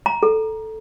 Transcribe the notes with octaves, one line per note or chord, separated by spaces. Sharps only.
A#5
A4